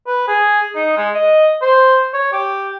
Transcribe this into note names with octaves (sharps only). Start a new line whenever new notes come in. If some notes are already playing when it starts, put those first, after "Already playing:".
B4
G#4
D#4
G#3
D#5
C5
C#5
G4